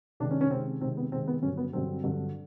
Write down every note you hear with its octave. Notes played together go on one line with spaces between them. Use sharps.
C3 D#3 G#3 D4
C#4
C#4
C3 D#3 G#3 C4
C3 D#3 G#3 C4
B3
C3 D#3 G#3 C4
B3
G2 D3 F#3 C#4
B3
G2 D3 F#3 C4
G2 D3 F#3